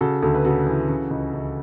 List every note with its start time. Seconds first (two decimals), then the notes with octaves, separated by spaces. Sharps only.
0.01 C#3 F#4 A4
0.23 D2 F#4 A4
0.35 B4
0.45 C#3 F#4 A4
0.67 E3
0.89 C#3
1.11 C#2
1.34 C#2